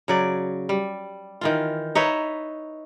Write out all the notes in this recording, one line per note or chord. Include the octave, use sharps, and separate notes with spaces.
C#3 F#3 D5
G3
D#3 E3 F4
D#4 B4 C#5 E5